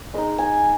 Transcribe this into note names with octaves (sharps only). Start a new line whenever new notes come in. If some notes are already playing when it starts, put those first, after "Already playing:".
G#3 D#4 D#5
G#5